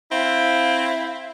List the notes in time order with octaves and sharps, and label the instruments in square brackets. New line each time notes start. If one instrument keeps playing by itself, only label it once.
[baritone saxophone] C4 [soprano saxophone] E4 [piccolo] F5